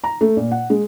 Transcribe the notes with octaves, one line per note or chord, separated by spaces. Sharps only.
A#5
A3
A#2
F#5
G#3